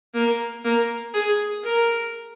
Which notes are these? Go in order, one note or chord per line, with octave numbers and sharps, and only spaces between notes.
A#3
A#3
G#4
A#4